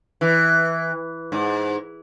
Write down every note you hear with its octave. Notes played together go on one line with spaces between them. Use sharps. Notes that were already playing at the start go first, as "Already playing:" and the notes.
E3
G#2